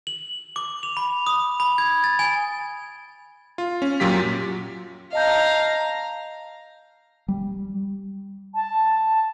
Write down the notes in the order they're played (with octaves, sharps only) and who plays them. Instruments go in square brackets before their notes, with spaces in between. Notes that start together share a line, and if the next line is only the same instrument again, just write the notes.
[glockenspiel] F#7
D6
F7
B5
D#6
B5
G#6
A6
G#5
[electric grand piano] F4
C#4
F#2 A#2 F#3 F4 G4 B6
[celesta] D#5 A5 G6 [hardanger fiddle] F5 A#5
[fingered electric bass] G3
[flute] A5